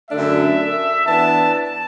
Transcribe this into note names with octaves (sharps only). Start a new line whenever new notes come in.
F#2 D3 A3 D4 E5
E3 B3 D4 A5
A5